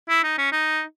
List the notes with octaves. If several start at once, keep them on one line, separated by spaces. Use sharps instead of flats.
E4
D#4
C#4
D#4